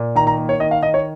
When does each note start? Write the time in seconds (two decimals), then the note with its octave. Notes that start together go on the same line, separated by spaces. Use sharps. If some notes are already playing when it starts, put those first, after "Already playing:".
Already playing: A#2
0.15 D#3 A#5
0.27 A#5
0.38 A#3
0.49 C#5
0.60 D#3 D#5
0.71 F5
0.82 D#3 D#5
0.94 C#5